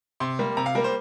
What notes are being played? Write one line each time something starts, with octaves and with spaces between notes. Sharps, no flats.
C3 C6
G3 A#3
C3 A#5
F5
G3 A#3 A#4
C5